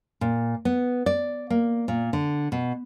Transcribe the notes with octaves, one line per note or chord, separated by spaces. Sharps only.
A#2
B3
D5
A#3
A#2
D3
B2